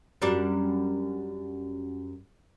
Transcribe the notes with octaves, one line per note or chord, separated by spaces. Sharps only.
F#2 G3 D4